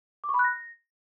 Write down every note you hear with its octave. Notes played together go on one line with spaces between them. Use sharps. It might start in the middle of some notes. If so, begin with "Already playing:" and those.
D6
C#6
B5
F#6
A#6